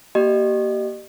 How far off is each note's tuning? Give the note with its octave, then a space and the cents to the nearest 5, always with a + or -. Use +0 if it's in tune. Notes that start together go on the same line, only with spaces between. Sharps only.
A#3 +0 G4 -25 D#5 -40